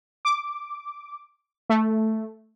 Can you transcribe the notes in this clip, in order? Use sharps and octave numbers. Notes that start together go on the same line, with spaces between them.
D6
A3